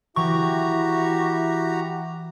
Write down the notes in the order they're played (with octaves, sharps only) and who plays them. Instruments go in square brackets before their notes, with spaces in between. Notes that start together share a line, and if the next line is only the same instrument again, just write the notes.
[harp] E3 [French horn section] E4 [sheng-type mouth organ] F#4 G4 A#5 [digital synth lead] C#6